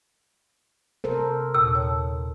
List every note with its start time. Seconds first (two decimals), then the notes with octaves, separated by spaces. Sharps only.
1.04 C3 A4 A#4 C5
1.54 D#2 A#2 D#6 E6
1.75 C#5 A5